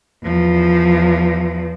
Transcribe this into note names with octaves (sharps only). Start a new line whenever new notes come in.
E2 F3